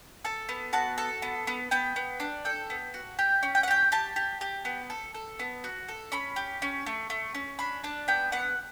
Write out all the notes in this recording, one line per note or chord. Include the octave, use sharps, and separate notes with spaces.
A4 A5
B3
F#4 A5
A4 A5
B3
B3
B3 G5
B3
D4
A4 G5
B3
F#4
G4 G5
C#4
G5
F#5
G4 G5
G4 A5
G4
G4
B3
A4
A4
B3
F#4
A4
C#4 B5
G4
C#4
A3
A3
C#4
D4 B5
D4 A5
B3 G5
B3 F#5